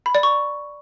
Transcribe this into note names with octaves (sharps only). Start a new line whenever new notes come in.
B5
D5
C#6